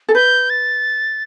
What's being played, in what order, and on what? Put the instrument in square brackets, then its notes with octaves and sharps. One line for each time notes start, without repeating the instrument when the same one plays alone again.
[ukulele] A4
[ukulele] B4 [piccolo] G6
[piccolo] A6